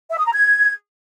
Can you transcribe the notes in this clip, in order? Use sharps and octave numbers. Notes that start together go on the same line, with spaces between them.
E5
D#6
A#5
G#6